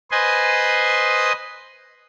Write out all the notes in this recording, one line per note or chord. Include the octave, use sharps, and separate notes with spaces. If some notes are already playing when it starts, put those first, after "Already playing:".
B4 C5 D#5 G#5 C6